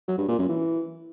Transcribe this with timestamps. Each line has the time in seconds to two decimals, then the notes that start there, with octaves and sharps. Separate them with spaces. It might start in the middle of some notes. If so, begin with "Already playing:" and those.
0.08 F#3
0.18 G2
0.28 A#2
0.39 F#2
0.49 E3